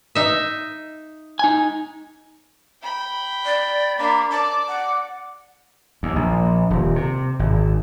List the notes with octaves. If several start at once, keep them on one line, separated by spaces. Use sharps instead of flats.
D#4 E5
D#4 G#5
G5 B5
D5
A#3 D4 B5
D5 A5 D6
F#5
D#2
A#1
D#1
C3
G#1